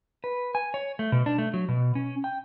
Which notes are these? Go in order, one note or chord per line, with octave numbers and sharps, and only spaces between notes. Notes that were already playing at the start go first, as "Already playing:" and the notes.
B4
G#5
C#5
A3
B2
D4
A3
F#3
B2
C#4
G5